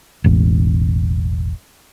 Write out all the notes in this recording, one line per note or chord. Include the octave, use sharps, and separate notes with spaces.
E1 A1